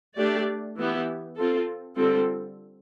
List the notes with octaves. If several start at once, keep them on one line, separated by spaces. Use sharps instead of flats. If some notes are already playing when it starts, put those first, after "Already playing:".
A3 D4 G4 D5
E3 B3 E4 G4
C4 F4 A4
D3 G3 C4 F4 A4